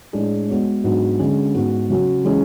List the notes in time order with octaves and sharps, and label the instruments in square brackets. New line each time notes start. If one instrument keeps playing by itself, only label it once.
[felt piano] A2 G#3 D4 G#4 D5
G#3 B3 F#4 C#5
G#2 F#3 B3 D4 F#4
D3 G#3 C#4 G#4
G#2 G#3 B3 F#4
C#3 F#3 C#4
E3 G#3 C#4 G#4